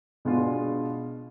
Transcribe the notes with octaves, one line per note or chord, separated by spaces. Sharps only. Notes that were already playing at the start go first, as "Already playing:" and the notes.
B2 G#3 B3 D4 F4